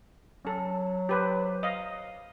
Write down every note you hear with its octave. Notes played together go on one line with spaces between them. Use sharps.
F#3 C#4 A4
G4 B4 C5
D#5 F5